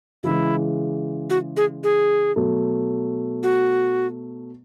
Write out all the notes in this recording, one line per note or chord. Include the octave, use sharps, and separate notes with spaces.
C#3 E3 G#3 E4
F#4
G#4
G#4
B2 F#3 A3
F#4